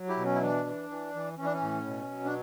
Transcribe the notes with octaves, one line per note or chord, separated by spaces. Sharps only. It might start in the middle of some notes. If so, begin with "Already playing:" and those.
Already playing: F#3
E4 G4
B2
C#4
E4
E3 D4
E3
E3
E3
E3 C#4
D4
C#4
A2
B2
F#3
D4